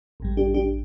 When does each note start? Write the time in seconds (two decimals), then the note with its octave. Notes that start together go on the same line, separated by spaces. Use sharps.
0.20 A1 G2 G3
0.37 D4 G4
0.54 D4 G4